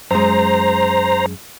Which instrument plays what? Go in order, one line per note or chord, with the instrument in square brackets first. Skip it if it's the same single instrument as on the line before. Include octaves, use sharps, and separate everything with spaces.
[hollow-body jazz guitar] F#2 G#3 [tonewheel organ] C5 A#5